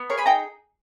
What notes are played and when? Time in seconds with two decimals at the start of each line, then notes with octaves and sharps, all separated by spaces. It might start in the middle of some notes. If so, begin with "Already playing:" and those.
Already playing: B3
0.10 G#4 A#4 C#5
0.18 G#5 B5
0.26 D#4 G5 A#5